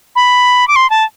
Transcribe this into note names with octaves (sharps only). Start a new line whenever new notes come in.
B5
D6
C6
A5